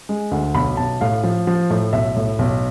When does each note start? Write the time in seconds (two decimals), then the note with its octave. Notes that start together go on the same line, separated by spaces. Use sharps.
0.09 G#3
0.31 D2
0.54 B1 B5
0.77 B1 A5
1.01 A2 F5
1.24 F3
1.47 F3
1.70 A2
1.93 B1 E5
2.16 A2
2.39 B1